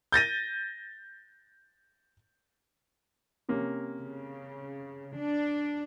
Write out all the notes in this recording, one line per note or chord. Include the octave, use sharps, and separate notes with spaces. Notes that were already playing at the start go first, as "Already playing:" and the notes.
G6 A6 A#6 D#7
C3 A#3 C#4
C#3
D4